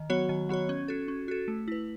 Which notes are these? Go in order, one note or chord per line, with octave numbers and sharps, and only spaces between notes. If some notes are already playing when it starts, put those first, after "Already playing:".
Already playing: D#3
F#3 B3 F#4 C#5
D#3
F#3 B3 F#4 C#5
C#4
F#4 A4
C#4
F#4 A4
A3
E4 B4